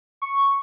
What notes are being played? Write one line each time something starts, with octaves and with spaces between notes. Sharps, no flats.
C#6